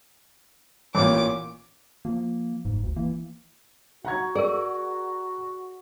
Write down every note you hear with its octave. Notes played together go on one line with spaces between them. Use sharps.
A1 A#2 D6
F3 A#3
F#1 G#2
D2
E3 A#3
F#4 F#5 A#5 G#6
G#4 A#4 D5